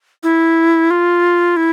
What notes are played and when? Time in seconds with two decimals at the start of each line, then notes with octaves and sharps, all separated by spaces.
0.23 E4
0.91 F4
1.57 E4